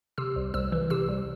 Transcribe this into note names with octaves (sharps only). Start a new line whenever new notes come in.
C3 E6
C2
C2 E6
E3
C3 E6
C2